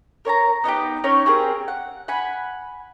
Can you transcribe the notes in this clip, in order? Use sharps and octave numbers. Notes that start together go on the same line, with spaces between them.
A#4 C#5 A5 A#5
B3 D#4 F4 G4
C#4 D#4 C#5
C4 G4 G#4 A#4
F#5
F#5 G#5 B5